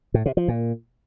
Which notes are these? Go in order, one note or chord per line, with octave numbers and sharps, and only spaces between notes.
A2
C3
F3
A#2